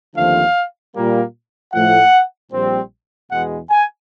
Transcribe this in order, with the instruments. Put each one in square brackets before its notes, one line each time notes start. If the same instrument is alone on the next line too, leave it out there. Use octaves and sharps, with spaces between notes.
[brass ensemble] D#2 D3 F3 A3 C4 F5
A#2 G3 A#3
A2 F3 A3 F#5
A#1 A#2 G3 C4
E2 B2 G#3 B3 F#5
G#5